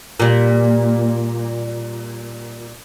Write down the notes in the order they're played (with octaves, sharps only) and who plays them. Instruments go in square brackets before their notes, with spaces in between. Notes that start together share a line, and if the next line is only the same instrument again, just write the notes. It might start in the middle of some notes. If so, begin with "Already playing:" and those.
[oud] A#2 G3